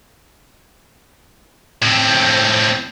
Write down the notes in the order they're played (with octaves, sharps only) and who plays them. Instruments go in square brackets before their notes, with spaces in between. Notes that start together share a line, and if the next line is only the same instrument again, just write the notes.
[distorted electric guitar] A2 C4